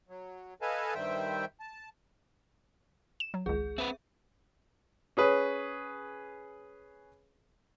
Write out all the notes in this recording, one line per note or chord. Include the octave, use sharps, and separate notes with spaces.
F#3
A4 B4 D#5 F5 G#5 A5
G2 D#3 G3 C5 E5 G5
A5
E7
F#3
G#1 C#2 G#4
C4 B4 E5
C#4 G#4 B4